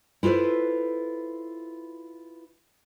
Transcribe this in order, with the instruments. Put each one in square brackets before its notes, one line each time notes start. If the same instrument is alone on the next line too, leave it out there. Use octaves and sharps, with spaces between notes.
[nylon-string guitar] E4 F4 A4 B4 C5